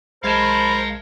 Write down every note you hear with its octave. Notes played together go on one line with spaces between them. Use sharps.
B1 G#3 A#4 C5 F5 A5 B5 G#6